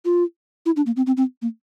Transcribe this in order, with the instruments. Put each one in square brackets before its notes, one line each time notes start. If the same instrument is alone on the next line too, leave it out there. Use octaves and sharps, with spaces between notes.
[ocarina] F4
E4
D4
A#3
C4
C4
C4
A#3